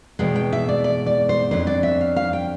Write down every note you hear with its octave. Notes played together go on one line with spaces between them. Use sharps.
E2 B2 G#3 G5
G5
E5
D5
D5
D5
C5
F2 D3 F#3 C5
D5
E5
F5
F5
G5